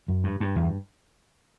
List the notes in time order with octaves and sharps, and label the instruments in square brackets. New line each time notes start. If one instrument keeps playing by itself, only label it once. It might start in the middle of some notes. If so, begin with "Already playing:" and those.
[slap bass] F#2
G2
G2
E2